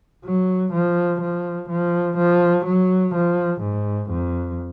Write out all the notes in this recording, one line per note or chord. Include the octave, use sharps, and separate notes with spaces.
F#3
F3
F3
F3
F3
F#3
F3
G#2
F2